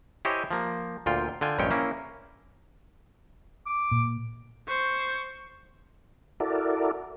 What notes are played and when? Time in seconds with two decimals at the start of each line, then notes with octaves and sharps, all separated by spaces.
0.25 E4 G4 C5 C#5 D#5 G#5
0.51 F3 A#3
1.06 D2 A#2 F4 G5
1.41 D3 F4 G5 G#5
1.59 A#1 G2 G#3 C#4 C#5 G5
1.71 A#3 C#4 E4
3.66 D6
3.91 A#2
4.68 C5 C#6
6.40 E4 F#4 A4 A#4 D5